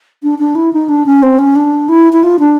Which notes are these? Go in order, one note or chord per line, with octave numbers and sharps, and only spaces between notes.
D4
D4
E4
D#4
D4
C#4
C4
C#4
D4
E4
E4
F4
D4